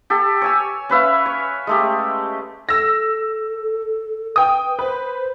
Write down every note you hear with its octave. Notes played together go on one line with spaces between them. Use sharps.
G4 A4
C#5 G#5 E6
C#4 B4 E5 F5
C#5
G#3 A3 G4
A4 E6 A#6
B4 G5 D#6
B4 C5